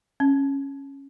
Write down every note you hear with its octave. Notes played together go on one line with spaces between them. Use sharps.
C#4